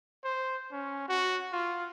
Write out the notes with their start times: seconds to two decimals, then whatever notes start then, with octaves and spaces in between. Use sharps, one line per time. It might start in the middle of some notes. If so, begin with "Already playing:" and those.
0.24 C5
0.72 C#4
1.08 F#4
1.52 F4